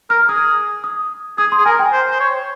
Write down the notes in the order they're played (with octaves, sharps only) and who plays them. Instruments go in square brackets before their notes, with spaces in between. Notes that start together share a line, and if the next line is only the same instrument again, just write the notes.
[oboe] A#4 [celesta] F6
[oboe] G#4 [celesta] D#6
[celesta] D#6
[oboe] G#4 [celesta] D#6
[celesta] C6
[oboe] G#4
[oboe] A#4 [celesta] G#5
[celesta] G5
[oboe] C5
C5
C#5